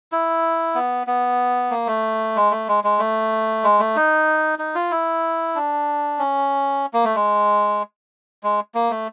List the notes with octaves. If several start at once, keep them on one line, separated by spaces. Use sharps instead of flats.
E4
B3
B3
A#3
A3
G#3
A3
G#3
G#3
A3
G#3
A3
D#4
D#4
F4
E4
D4
C#4
A#3
A3
G#3
G#3
A#3
A3